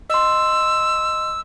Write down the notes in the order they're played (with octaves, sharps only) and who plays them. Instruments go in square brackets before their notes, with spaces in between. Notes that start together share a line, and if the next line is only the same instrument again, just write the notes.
[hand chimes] D#5 C6 [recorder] E6